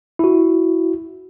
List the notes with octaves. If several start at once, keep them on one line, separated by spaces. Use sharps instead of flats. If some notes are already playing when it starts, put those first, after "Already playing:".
E4 F#4